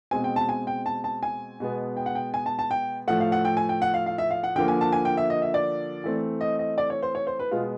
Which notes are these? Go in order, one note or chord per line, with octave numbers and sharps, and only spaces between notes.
B2 G#3 C4 G#5
G5
A5
G#5
G5
A5
A5
G#5
B2 G#3 B3
G5
F#5
G5
G#5
A5
A5
G5
A2 F3 A3 F#5
F5
F#5
G5
G#5
G5
F#5
F5
F5
E5
F5
F#5
D3 F3 A#3 G5
G#5
A5
G#5
G5
E5
D#5
E5
D5
E3 A3 C4
D#5
D#5
D5
C#5
C5
C#5
C5
B4
B2 G#3 B3 F4